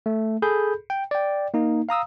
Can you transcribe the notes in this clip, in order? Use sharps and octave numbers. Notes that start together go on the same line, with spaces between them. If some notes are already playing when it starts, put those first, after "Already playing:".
A3
G#4 A4 B5 G6
G5
D5 G5
A#3 D#4
F5 A#5 D#6 E6